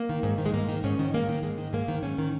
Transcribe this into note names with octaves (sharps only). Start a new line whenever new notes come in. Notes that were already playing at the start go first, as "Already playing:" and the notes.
Already playing: A#3
D#3
G#2
D#3
G#3
G#2 A#3
D#3
G#2 C#4
D#3
G#2 A#3
D#3
G#2 G#3
D#3
G#2 A#3
D#3
G#2 C#4
D#3